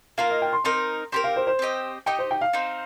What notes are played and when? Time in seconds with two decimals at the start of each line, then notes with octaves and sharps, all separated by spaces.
0.18 A#3 F4 A#4 F5
0.30 D#5
0.42 G5
0.53 C6
0.64 C4 D#4 A#4 C6
1.12 C4 G4 A#4 C6
1.24 F5
1.36 C5
1.47 C5
1.59 C4 G4 D#5
2.06 D#4 G4 D#5 G5
2.19 C5
2.31 G5
2.41 F5
2.53 C4 D#4 C5